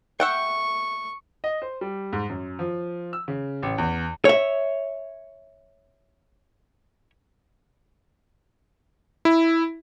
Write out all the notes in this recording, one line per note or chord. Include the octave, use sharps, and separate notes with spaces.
E5 F#5 G5 C#6
D#5
C5
G3
G#2
F#2
F3
E6
C#3
A1
E2
C#5 E5
E4